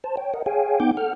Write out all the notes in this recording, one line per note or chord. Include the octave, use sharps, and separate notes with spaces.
C5 A5
C#5 G5
A#4 D#5 F#5
G#4 C#5 F5 G5 G#5
B3 D#4 F#5 G5 D6 G6
A4 F#5 F6